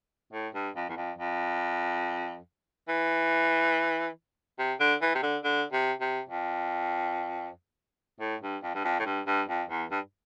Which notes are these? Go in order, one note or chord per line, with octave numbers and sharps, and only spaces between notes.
A2
G2
F2
E2
F2
F2
E3
C3
D3
E3
C3
D3
D3
C3
C3
F2
A2
G2
F2
G2
F2
A2
G2
G2
F2
E2
G2